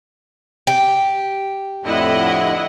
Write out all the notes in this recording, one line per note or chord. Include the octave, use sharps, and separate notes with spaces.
G4
F2 A2 D3 E4 D#5 F#5